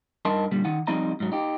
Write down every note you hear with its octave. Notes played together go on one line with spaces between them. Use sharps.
G2 D#4 A#4 D#5 A5 C6
A#2 D3 G3
D#3 D#4 F#5
F3 G3 C4 D#4 D#5 A#5
G#2 F#3
D#4 G4